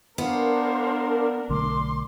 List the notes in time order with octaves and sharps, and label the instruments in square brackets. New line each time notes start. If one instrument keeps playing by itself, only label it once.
[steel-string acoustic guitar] B3 [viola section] D4 A#4 [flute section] C5 F5
[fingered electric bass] B1 D3 A3 [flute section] C6 D6